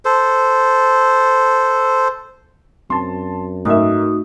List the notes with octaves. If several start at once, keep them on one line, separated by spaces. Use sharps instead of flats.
A4 C5
F#2 C4 A5 C6
G#2 A3 D#4 F#4 A#4 E5 D#6